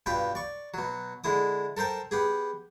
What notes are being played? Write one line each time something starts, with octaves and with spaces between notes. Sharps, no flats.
G2 B2 F4 G5 B5
D5 C#6
B2 F#3
D3 G#3 E4 D#6
A4 A#4 C5 G5 A5
B3 G4 G#4